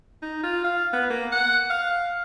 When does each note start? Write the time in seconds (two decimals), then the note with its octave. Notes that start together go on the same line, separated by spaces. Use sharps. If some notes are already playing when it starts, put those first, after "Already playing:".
0.22 D#4
0.44 F4
0.64 F5
0.93 B3
1.10 A#3
1.32 F#5
1.70 F5